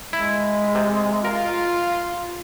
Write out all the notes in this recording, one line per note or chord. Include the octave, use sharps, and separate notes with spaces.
G#3 E4
C3
F4 A#4